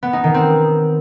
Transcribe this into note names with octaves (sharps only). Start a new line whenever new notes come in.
B3
D#4
D#3
C4